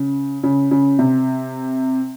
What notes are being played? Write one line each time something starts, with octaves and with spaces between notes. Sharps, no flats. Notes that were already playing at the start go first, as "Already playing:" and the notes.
Already playing: C#3
C#3
C#3
C3